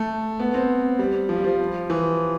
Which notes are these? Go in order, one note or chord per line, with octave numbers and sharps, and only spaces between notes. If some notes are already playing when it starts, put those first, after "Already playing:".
Already playing: A3
B3
C4
G3
F3
G3
F3
E3